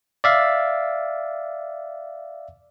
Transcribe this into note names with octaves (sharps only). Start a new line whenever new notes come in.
D5 E5 F5